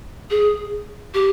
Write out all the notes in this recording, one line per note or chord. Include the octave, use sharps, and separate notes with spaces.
G#4
G4